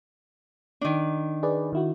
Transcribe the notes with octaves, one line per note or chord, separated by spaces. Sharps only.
D#3 D4
G#4 B4 D5
D#3 E4 F#4